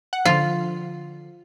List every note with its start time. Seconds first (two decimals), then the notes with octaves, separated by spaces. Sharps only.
0.13 F#5
0.25 D3 F3 F4